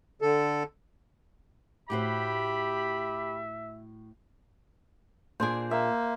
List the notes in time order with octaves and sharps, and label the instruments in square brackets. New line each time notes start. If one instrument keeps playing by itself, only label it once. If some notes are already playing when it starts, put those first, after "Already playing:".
[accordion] D3 A4
[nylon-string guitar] A2 F#4 C5 [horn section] G4 B5 [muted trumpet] E5
[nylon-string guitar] A#2 D4 G#4 [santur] C5
[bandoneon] A#3 [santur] E5